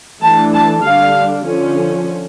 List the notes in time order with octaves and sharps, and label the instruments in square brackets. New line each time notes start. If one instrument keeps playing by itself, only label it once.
[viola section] E3 A3 D4 A5
A5
D3 G3 D4 F5
D3 F3 C#4